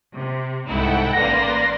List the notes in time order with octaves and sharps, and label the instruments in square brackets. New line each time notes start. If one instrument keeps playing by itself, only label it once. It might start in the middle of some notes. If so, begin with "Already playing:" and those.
[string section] C3
[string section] C2 G#2 E4 [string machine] A4 F#5 G5
[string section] A1 A#3 [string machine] B4 D5 C6 [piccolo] A#6